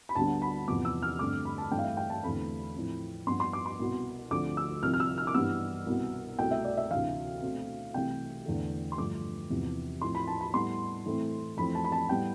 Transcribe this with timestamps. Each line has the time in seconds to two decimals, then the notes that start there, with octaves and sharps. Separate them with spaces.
0.09 B5
0.15 D2 D3 G3 B3 A5
0.42 B5
0.68 E2 C3 F3 B3 D6
0.85 E6
1.02 F6
1.19 G2 D3 A3 C4 D6
1.45 B5
1.58 A5
1.71 G2 E3 A3 C4 G5
1.78 F5
1.84 E5
1.97 G5
2.10 A5
2.23 E2 D3 A3 C4 B5
2.75 A2 F3 C4
3.27 G2 F3 B3 C6
3.40 C6
3.53 D6
3.66 C6
3.79 C2 B2 B3
4.31 D2 D3 F3 A3 C4 D6
4.57 E6
4.82 C2 C3 F3 F6
4.94 F6
5.00 E6
5.18 F6
5.27 D6
5.34 G2 E3 G3 B3 E6
5.86 C2 B2 B3
6.39 C2 B2 A3 G5
6.51 E5
6.64 D5
6.77 E5
6.90 D2 C3 E3 F5
7.42 B2 A3 C4
7.94 C2 C3 E3 A3 G5
8.46 E2 D3 A3
8.92 C6
8.98 G2 D3 F3 A3 D6
9.50 E2 C3 F3 B3
10.01 A2 F3 C4 C6
10.15 B5
10.28 A5
10.41 B5
10.54 A2 G3 B3 C6
11.05 A2 E3 A3 C4
11.57 F2 E3 A3 C4 B5
11.75 A5
11.85 B5
11.92 A5
12.09 A2 G3 B3 G5